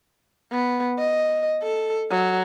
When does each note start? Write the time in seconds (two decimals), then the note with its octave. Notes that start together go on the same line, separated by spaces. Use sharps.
0.52 B3
0.99 D#5
1.63 A4
2.11 F#3